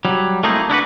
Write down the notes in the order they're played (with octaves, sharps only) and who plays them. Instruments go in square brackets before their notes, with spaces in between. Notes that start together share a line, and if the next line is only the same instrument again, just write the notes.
[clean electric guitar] F#3 G3
A3 A#3 C4 D#4 E4 G#4
D4 E4 F#4 B4